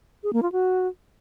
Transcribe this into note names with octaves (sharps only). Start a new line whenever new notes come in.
G#4
A#3
F4
F#4